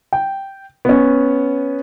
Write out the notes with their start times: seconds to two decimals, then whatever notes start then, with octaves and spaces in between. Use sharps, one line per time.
0.13 G5
0.85 B3 C#4